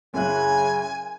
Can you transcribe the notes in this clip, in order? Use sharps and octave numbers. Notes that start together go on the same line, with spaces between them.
F#2 C#3 E4 G#5 F#6